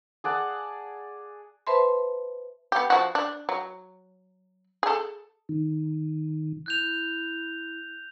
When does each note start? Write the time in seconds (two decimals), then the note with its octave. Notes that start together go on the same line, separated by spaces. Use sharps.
0.24 G#4 D5 F#5 A5
1.67 B4 C5 E5 A5 B5 C6
2.72 B3 G4
2.90 F3 F#4
3.15 D4
3.49 F#3
4.83 G#4 A4
5.49 D#3
6.66 E4 F#6 G6 F7